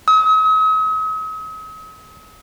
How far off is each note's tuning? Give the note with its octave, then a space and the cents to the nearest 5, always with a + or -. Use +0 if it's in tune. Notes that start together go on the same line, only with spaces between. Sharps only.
D#6 +45